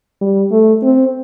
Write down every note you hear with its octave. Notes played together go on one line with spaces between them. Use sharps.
G3
A3
C4